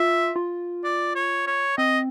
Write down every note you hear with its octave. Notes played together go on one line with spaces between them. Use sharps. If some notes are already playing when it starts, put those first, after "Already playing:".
Already playing: F4 E5
F4
D5
C#5
C#5
C4 D#5